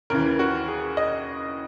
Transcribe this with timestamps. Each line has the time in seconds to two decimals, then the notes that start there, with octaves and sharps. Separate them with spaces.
0.10 D#2 C#3 E3 A#4
0.39 F#4
0.68 G#4
0.97 D#5